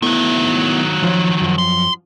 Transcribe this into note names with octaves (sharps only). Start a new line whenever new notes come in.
D#3 F#3 A3 B3 E4
F3 F4 C#5
F#2 F3
C6